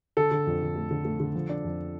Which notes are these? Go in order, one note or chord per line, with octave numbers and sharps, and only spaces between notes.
D3 A4
D3
F2
D3
A3
D3
A3
D3
F3
D4
F2